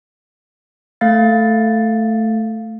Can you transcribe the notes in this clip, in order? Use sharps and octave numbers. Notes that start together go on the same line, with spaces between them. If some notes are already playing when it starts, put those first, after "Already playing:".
A3 F5 A6